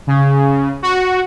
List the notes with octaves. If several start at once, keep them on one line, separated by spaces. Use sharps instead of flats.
C#3
F#4